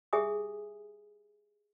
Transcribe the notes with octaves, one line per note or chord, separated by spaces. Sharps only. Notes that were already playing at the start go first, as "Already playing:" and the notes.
G4 G#4 E5 G#5 D#6